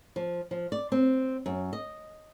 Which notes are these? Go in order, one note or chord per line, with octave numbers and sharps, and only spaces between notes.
F3
F3
D5
C4
F#2
D#5